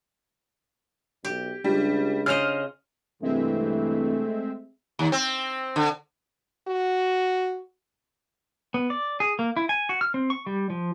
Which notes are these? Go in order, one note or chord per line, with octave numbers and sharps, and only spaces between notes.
B1 G4
C#2 G3 D4 F4
C#3 C5 D#5 F6 F7
G2 C3 E3 G#3 A3 C4 E5
D#2
C4
D3
F#4
B3
D5
G#4
A#3
E4
G#5
F#4
F6
C4
C#6
G3
F3